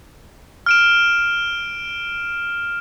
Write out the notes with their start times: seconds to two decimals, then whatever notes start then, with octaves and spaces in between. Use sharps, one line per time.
0.66 F6 D7 E7